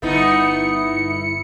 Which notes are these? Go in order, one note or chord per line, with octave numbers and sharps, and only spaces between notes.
G1 A3 B3 D#4 E4 C#7